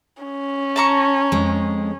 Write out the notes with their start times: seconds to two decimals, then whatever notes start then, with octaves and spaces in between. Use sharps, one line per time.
0.23 C#4
0.76 A5 A#5 C#6
1.32 F2 G#3